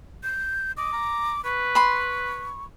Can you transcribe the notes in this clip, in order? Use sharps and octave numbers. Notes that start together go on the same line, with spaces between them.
G6
D#5 D6
A#5
B4 C#6
B5 C6